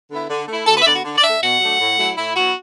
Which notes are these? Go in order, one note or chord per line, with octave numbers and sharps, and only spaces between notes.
D3 B3 E4
D3
A3 E4
D2 A4
B4
E5
D3 B3 D5
F#4
D3
D5
A3 D4 E5
B2 F#5
F#3 A3 D4
A2
F#3 A3 E4
A2 E4
F#3 B3 E4 F#4